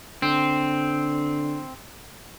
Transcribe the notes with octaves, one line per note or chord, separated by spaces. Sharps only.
D3 C4